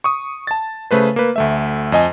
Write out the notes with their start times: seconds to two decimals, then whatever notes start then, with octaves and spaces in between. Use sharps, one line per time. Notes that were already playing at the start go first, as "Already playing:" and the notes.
0.04 C#6 D#6
0.47 A5 A6
0.91 C#3 A3 B4 C5
1.16 A#3 B4
1.36 D2 A3 E5
1.92 F2 D#5 G#5